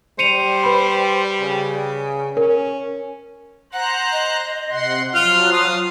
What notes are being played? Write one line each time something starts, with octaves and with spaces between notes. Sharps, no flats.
G3 C5 C#7 D#7 F7
B4 B5
C#3
C#4 A#4
C5 F#5 A#5 F#6
D#5
C3 F#5 C6
F3 F#3 F4 F6 F#6
F4 F5 D#6